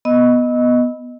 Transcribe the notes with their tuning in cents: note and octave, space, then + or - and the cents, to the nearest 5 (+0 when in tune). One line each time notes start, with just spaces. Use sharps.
B3 -5 D#5 +0 E6 -25